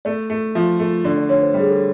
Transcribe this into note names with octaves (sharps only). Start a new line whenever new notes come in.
A3 D5
A3
F3 E5
A3
D3 D5
D5
D3 C#5
C5
G3
G#4
A4